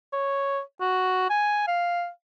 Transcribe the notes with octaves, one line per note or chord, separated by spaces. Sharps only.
C#5
F#4
G#5
F5